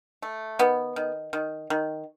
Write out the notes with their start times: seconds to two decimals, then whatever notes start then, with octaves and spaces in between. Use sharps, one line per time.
0.22 A3
0.59 D#3 B3
0.96 D#3
1.33 D#3
1.70 D#3